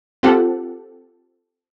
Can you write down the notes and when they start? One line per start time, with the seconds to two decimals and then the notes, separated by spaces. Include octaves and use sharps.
0.23 C4 F4 G4 A4 F#5